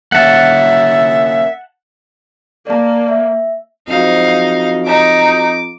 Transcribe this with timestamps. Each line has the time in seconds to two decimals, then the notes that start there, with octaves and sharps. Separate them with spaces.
0.12 A#3 C#4 E5 F#5 A5
2.67 A#3 D5 A5
3.08 E5
3.88 F2 F3 F#3 G#3 D#4 F5
4.86 D#4 D6